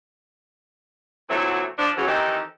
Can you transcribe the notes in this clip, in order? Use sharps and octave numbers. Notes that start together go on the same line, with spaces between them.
D2 A#2 F#3 A3 C4 E4
F3 D4
C#3 E3 F#3
D#3 E3 C4 D#4 G4 A4